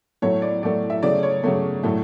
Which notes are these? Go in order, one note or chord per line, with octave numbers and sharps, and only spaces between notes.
A2 F#3 A3 C#5
D5
A2 F#3 A3 D5
E5
C#3 F#3 A3 D5
C#5
C#3 F#3 A3
A2 F#3 A3